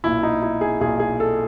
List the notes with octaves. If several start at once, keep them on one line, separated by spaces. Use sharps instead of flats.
B1 A#2 E4
D#4
E4
G#4
B1 A#2 G#4
G#4
A4